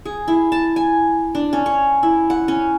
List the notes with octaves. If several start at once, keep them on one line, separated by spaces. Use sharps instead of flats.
G#4
E4
A5
G#5
D4
C#4
C#5
E4
F#5
C#4